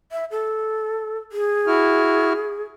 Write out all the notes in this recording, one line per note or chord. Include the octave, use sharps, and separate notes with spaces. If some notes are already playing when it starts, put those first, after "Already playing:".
E5
A4
G#4
E4 F#4 F6